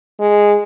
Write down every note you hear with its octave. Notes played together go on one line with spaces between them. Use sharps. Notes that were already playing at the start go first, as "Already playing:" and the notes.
G#3